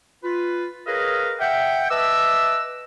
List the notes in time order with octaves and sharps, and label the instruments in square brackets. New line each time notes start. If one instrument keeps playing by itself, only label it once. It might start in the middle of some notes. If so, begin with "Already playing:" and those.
[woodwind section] F4 B4
G#4 A#4 B4 C#5 D#5 F5
E5 F#5 G5
B4 D#5 E5 A5 D6 E6